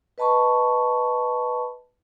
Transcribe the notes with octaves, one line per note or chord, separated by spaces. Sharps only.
B4 D#5 A5 B5 C#6